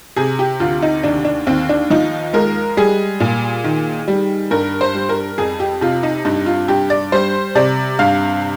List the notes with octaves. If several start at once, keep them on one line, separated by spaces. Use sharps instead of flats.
C3 G#4
G4
D2 F4
D#4
D#2 D4
D4
D#2 C4
D4
F3 D#4
G#3 A#4
G3 G#4
A#2
D#3
G3
G2 A#4
C5
G3
A#4
F2 G#4
G4
C3 F4
D#4
G2 D#4
F4
G2 G4
D5
G3 C5
C3 D5
G2 F5